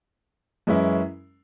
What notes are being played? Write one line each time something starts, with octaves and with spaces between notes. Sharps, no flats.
F#2 E3 G#3 C#4 E4